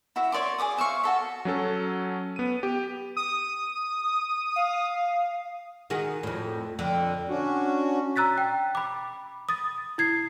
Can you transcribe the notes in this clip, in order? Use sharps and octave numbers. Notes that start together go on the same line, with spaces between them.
E4 F#4 E5
C#5 D5 C6 D6
G#4 C#5 D6 D#6
C5 E5 F5 C#6
F#4 A4 E5
F#3 C#4 A4
B3 D#7
G4
D#6
F5
D#3 F#4 G#4
F2 A2
F2 D3
C#4 D4 F#4
A#5 E6 F#6 A6 B6
G5
B5 D6
D#6 A6
E4 G#6 C7